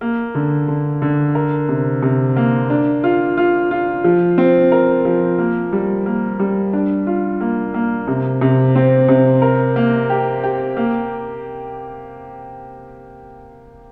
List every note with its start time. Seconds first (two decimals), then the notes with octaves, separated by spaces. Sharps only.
0.01 A#3
0.35 D3
0.68 D3
1.02 D3
1.35 A#4
1.69 C3
2.03 C3
2.36 A#3
2.70 D4
3.04 F4
3.37 F4
3.71 F4
4.04 F3
4.38 C4
4.72 A#4
5.05 F3
5.39 A#3
5.72 G3
6.06 A#3
6.39 G3
6.73 D4
7.07 F4
7.40 A#3
7.74 A#3
8.08 C3
8.41 C3
8.75 C4
9.09 C3
9.42 A#4
9.76 A#3
10.10 G4
10.43 G4
10.77 A#3